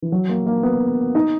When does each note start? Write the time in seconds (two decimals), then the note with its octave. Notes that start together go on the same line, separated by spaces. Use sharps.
0.02 E3
0.12 F#3
0.29 A#3
0.46 A#3
0.63 B3
1.15 D#4